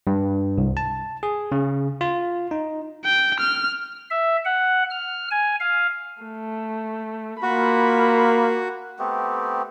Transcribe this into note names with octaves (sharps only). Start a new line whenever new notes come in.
G2
C2
A5
G#4
C#3
F4
D#4
G5
F6
E5
F#5
F6
G#5
F5
A3
A#3 F4 F#4 B5
A3 B3 C4 G4